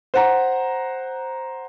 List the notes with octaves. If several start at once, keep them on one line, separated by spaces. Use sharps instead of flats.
C5 F#5 A#5